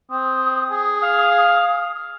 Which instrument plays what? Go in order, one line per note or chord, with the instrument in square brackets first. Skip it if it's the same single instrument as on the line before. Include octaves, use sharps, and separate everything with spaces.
[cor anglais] C4 [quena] D#6
[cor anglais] G#4
[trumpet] F5